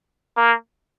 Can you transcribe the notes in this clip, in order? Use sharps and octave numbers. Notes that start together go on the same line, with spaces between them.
A#3